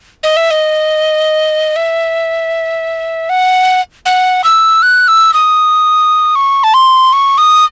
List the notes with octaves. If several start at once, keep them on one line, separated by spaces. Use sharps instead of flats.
D#5
E5
D#5
E5
F#5
F#5
E6
F#6
E6
D#6
C#6
A5
C6
C#6
D#6